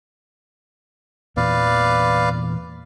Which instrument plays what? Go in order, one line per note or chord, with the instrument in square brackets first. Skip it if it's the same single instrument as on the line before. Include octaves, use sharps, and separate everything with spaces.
[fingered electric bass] E2 A#2 E3 [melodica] B4 D5 F5